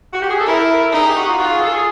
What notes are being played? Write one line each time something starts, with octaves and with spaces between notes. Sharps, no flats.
F#4
G4
G#4
A4
E4 A#4
A#4
A4
D#4 G#4
G4
F#4
F4
F4 F#4
G#4
A4
G#4